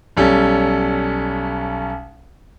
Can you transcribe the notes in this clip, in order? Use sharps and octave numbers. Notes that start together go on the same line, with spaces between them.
B1 G3 C#4 A4